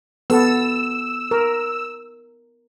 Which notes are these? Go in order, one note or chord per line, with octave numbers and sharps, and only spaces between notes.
B3 A4 E6
A#4